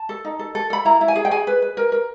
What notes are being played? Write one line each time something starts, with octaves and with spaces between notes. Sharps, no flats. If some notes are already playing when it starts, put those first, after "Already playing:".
Already playing: A5
A4
D#4
A4
A4
A4 B5
E4 A#5
E4
G#5
G#4
G5
G#4 G#5
B4
B4
A#4
A#4